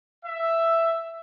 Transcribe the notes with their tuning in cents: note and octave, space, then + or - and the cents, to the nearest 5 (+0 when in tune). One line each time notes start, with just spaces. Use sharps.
E5 +5